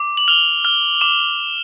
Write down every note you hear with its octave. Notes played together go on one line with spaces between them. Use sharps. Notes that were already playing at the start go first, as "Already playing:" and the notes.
Already playing: D6
F#7
F6 F7
F6
D6 E7